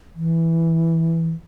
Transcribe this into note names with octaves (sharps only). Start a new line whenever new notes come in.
E3